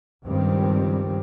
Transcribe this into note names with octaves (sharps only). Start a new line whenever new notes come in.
C#2 G2 D#3 G3 C4